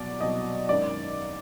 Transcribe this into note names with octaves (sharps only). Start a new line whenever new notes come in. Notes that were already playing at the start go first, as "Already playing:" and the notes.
Already playing: C2 B2 F#3 D5
C2 B2 F#3 D#5
G#1 F#2 D#3 D5